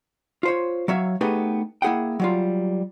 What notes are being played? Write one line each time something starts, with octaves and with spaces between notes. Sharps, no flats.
F4 C5 C#5
F#3 C#5 E5 F5
A3 B3 D#4 G4 G#4 B4
A#3 E4 G#4 F#5 G5
F#3 G3 F4